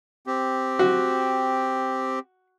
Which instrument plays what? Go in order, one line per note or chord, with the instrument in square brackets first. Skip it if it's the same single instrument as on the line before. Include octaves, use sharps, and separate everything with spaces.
[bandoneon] C4 G4
[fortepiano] F#4